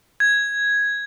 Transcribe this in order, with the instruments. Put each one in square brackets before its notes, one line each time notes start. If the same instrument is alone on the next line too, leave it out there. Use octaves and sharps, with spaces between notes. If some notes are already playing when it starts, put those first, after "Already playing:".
[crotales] G#6